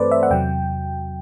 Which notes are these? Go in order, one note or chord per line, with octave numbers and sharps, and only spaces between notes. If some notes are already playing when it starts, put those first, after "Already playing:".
Already playing: G2 E3 A3 C4 A4 B4 C5 D5
E5
F#5
E2 C3 F#3 G5